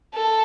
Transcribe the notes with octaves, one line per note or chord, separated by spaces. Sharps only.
A4